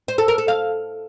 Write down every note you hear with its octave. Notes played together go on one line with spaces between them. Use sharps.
C5
A4
A#4
A4
F5